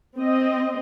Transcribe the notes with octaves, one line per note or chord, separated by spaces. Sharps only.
C4 D#5